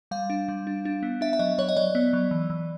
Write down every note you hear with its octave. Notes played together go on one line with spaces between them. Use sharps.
G3 F5
D4
G3
D4
D4
B3
D4 E5
E5
F#3 D#5
F#3 C#5
D#5
F#3 D5
B3
F#3
E3
E3